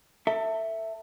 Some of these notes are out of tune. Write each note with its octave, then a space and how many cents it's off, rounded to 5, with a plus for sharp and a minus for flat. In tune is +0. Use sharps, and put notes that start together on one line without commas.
A4 +30 E5 +0